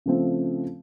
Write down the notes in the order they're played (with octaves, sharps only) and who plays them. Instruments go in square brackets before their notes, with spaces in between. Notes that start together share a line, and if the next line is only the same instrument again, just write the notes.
[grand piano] C#3 F3 A3 C4